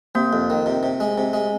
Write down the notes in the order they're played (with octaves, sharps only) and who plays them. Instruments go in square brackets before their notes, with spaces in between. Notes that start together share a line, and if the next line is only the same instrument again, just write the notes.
[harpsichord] C3 [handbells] A#3
[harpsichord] F2
D#3
C3
C3
G#3
C3
G#3